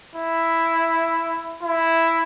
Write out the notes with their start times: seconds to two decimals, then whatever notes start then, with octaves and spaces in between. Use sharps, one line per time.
0.16 E4
1.63 E4